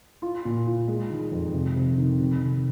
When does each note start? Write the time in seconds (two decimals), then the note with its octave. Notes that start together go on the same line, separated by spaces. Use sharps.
0.22 F4
0.45 A#2
0.67 F4
0.88 G#3
1.10 D#3
1.32 F2
1.54 C3
1.75 C3
1.98 D#3
2.19 C3
2.41 C3